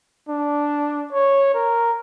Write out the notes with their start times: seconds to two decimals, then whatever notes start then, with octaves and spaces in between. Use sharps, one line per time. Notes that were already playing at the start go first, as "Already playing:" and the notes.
0.29 D4
1.12 C#5
1.54 A#4